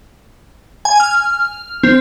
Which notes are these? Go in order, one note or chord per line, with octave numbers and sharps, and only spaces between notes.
G#5
F6
C4